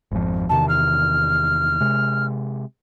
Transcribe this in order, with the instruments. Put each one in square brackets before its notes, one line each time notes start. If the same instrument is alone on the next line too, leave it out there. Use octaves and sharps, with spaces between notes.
[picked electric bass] G#1 F2 F3
[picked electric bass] E2 C3 D#3 [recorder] A5
[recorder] F6
[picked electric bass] C3 G#3